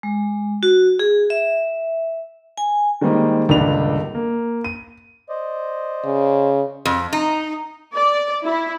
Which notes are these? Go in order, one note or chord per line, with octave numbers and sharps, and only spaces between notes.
G#3
F#4
G#4
E5
G#5
D#3 G3 G#3 A#3 C4 D#4
D#1 C#2 G2 D3 D4 F7
A#3
D#7
C5 D5 D#5
C#3
F2
D#4
D5
E4